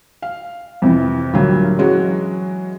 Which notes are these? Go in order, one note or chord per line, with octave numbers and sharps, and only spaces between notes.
F5
F2 C3 E3
D2 A#2 F#3 G3
E3 F#3 G#3 C#4 F#4